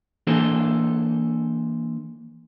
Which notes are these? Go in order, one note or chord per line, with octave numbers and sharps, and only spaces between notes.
E3 A#3 D4 G#4 A4 C5